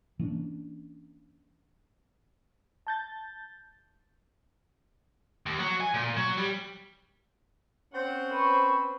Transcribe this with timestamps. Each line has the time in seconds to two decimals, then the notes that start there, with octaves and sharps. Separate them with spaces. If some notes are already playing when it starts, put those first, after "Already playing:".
0.19 E3 A#3 C#4 D4
2.87 A5 G6 A6
5.46 D#2
5.59 F#3
5.80 G#5
5.94 A#2
6.16 F#3
6.37 G3
7.93 C4 C#4 C5 F#5
8.32 B4 C#6